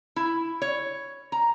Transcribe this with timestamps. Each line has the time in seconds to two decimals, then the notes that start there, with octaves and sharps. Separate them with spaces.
0.16 E4
0.62 C#5
1.32 A#5